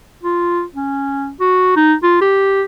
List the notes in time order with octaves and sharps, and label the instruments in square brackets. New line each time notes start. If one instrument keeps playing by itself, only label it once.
[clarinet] F4
C#4
F#4
D#4
F4
G4